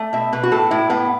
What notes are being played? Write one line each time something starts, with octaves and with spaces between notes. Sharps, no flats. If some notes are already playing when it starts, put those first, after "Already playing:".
Already playing: A3
B2 E5
B2 B4
F#4
A2 A4
A2 E4
A2 B3